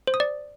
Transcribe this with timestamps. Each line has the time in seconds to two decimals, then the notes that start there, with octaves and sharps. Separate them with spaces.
0.07 C5
0.14 D#6
0.20 D5